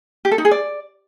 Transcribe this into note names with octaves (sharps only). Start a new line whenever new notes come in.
G4
A4
D#4
G#4
D5